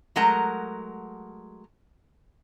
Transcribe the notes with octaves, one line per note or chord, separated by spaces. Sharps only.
F#3 G#3 A3 A#4 F#5 A#5